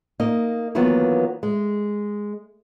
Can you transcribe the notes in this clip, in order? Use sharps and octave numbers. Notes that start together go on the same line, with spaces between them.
A#3 D#4 D#5
D#3 E3 F#3 A#3 B3 F4
G#3